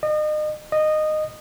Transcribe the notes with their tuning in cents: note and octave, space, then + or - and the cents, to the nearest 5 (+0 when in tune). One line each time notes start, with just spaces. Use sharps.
D#5 -35
D#5 -15